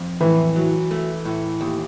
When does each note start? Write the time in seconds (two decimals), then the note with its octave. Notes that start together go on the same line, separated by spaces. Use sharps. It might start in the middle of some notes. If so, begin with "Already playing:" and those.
Already playing: F2
0.21 A2 E3
0.56 F#3
0.91 A3
1.25 A2
1.61 D#2